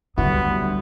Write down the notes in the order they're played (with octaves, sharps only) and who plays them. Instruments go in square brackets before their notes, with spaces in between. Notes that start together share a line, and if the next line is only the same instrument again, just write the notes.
[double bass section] D2 D3 G3 [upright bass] F#3 D4 [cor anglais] B3 [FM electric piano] E4 F#4